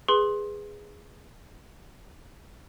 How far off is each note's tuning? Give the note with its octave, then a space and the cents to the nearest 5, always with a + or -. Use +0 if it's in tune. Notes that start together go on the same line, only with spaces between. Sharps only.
G#4 -10 B4 +0 C6 +15